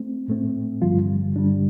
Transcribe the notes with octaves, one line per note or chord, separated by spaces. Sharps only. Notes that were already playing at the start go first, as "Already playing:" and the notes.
Already playing: A3 C4
A2 A3 C4
G2 D3 F3 G3 F4
G2 D3 G3 D4